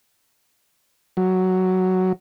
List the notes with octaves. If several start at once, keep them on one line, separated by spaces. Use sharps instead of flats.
F#3